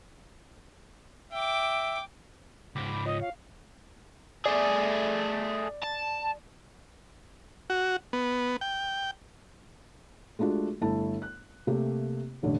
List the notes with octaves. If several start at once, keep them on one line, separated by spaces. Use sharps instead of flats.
E5 G5 D6
C#2 G#2 B5 D6
F4 C#5 D#5
F5
A3 G#4 D5
A5
F#4
B3
G5
G#3 A3 D4 F4 F#4
G1 A3 E4 A5
F#6
C3 A3 A#3 G4
E1 A1 D3